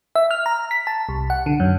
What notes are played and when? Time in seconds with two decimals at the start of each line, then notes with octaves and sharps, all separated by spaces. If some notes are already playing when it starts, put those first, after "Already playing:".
0.15 E5
0.31 F6
0.46 A#5
0.71 B6
0.87 A5
1.09 C2
1.30 F#5
1.46 D3
1.60 F#2